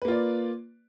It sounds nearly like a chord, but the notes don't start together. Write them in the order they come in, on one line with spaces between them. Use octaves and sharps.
B4 A#3 F4 D5